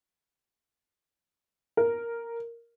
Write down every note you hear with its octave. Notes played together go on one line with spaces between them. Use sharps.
A#4